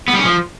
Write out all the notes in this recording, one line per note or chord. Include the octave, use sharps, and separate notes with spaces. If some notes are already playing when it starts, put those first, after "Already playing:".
B3
G3
C#4
F3